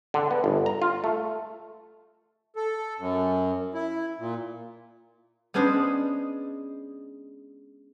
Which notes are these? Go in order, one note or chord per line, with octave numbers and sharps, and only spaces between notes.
D3
B3
G1
A#5
F4
A3
A4
F#2
E4
A#2
G#3 B3 C#4 D4 C5 D#5